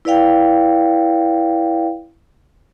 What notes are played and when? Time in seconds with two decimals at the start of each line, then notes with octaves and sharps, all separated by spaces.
0.05 E4 B4 D5 F5 G5